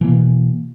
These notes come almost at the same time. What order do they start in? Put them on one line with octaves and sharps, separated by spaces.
E3 A#3 B2